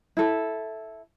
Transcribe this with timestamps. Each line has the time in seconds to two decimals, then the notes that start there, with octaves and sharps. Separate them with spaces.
0.17 E4 A4